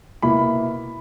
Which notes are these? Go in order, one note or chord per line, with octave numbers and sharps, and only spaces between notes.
B2 A#3 E4 B5